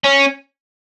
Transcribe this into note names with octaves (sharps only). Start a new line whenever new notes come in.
C#4